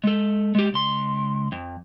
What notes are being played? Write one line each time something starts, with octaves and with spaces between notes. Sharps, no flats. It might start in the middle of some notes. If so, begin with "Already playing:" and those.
G#3 A4
G#3 G4
C#2 C6
F2